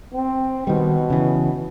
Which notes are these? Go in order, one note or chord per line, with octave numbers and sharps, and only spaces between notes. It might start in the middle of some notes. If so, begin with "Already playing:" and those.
C4
B2 D#3 G3
C#3 E3